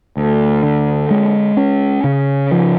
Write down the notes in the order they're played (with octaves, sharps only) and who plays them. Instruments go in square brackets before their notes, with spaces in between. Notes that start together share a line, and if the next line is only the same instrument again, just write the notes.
[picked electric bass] D2
D3
G#3
C#4
C#3
F3